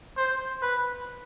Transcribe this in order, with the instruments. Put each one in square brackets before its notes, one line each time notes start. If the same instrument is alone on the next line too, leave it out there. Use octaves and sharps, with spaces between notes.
[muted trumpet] C5
B4